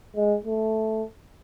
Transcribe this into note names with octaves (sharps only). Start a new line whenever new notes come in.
G#3
A3